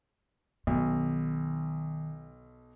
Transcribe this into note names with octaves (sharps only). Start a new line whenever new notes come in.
B1 D#3